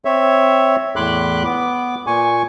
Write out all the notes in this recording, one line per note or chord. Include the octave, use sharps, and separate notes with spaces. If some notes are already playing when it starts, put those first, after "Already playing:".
C4 C#5 E5
E2 A2 B5 C6 D6 F#6
B3 D6
A#2 G#5 C#6